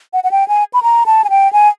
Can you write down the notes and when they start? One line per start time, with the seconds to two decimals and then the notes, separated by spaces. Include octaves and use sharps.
0.13 F#5
0.24 F#5
0.31 G5
0.48 G#5
0.74 B5
0.83 A#5
1.06 A5
1.24 G#5
1.30 G5
1.53 G#5